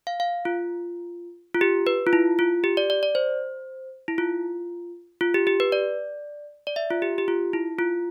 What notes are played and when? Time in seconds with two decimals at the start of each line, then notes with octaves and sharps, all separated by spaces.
0.07 F5
0.20 F5
0.45 F4
1.55 F4
1.61 G4
1.87 B4
2.07 F4
2.13 E4
2.39 F4
2.64 G4
2.77 D5
2.90 D5
3.03 D5
3.15 C5
4.08 E4
4.18 F4
5.21 F4
5.34 G4
5.47 G4
5.60 B4
5.72 D5
6.67 D5
6.76 E5
6.90 F4
7.02 G4
7.18 G4
7.28 F4
7.53 E4
7.79 F4